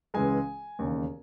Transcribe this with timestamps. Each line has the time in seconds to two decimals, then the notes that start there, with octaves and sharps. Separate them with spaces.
0.14 C#2 C#3 E3 G#3 G#5
0.79 E1 D#2 C#3